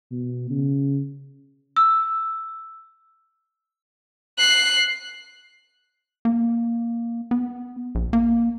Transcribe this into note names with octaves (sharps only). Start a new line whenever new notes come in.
B2
C#3
E6
F#6 C7
A#3
B3
A#1
A#3